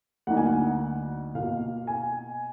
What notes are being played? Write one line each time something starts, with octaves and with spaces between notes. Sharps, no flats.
D2 D3 F#3 A#3 D#4 F#5
G#5
F#5
B2 A#3 F4 F5
G#5